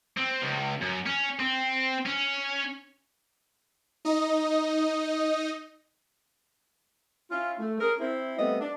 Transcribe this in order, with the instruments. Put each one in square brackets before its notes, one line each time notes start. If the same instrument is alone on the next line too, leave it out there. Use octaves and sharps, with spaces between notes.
[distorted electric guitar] C4
C#2
F#2
C#4
C4
C#4
[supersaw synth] D#4 D#5
[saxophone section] C#4 E4 F4
A3
C#4 G#4 A#4
C4 E4
G3 A3 B3 C4 D#5
D4